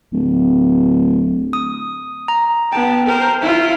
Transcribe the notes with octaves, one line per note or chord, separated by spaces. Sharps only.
D1
D#6
A#5
B3 G5 A5
A#4 C5
E4 F4